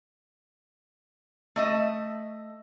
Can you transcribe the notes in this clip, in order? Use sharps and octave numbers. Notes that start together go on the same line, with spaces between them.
A3 D#5 E5